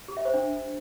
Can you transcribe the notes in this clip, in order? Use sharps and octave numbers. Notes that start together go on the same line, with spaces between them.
G4
E5
C5
D4